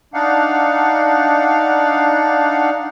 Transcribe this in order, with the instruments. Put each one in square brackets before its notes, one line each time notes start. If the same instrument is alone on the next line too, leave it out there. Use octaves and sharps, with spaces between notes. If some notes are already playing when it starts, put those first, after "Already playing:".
[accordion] D4 D#4 F5 F#5